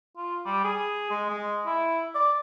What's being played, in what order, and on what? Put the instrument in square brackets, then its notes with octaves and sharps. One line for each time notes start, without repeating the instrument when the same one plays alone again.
[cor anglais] F4
G3
G#4
G#3
G#3
E4
D5